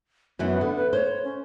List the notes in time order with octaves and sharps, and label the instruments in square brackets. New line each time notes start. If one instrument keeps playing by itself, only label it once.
[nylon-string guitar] F#2 E3 F#3 [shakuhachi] B3
[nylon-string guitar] D3
[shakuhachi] B4
[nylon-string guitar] C5 [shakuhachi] C#5
[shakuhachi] C#4